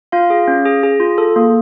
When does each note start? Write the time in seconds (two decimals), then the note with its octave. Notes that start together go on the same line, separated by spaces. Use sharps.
0.12 F4 F5
0.30 G#4
0.48 C#4
0.65 G#4
0.83 G#4
1.00 F4
1.18 A4
1.36 A#3